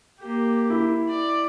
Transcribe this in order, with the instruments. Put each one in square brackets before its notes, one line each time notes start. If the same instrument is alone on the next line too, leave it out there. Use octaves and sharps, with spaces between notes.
[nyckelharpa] A#3 G4
[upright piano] E4
[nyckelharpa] D5